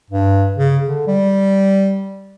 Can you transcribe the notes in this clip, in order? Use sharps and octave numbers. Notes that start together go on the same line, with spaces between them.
G2
C#3
D3
G3